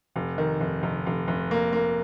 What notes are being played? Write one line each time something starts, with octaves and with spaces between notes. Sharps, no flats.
F1
D#3
F1
F1
F1
F1
A#3
A#3